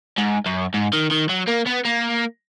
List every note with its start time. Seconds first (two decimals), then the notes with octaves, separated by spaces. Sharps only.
0.18 G#2
0.46 F#2
0.74 G#2
0.93 D#3
1.11 D#3
1.29 F#3
1.48 A#3
1.67 B3
1.85 A#3